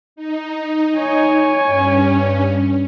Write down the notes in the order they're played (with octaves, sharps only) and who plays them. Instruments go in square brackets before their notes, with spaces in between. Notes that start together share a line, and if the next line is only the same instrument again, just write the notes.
[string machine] D#4
[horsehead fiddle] C#5 G#5
[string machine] G2 C#4